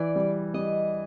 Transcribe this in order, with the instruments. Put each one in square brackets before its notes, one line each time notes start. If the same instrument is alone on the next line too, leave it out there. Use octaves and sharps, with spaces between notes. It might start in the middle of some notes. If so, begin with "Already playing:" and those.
Already playing: [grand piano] E3 [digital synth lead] D5
[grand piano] G3
[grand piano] G3 [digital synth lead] D#5